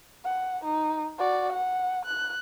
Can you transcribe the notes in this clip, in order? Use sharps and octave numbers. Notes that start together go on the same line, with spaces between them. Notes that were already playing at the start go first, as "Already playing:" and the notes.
F#5
D#4
F#4 D5
F#5
F#6